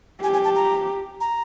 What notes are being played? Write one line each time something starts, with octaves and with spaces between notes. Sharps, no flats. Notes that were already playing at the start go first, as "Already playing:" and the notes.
G4 G#5
G#5
A5
A#5
A#5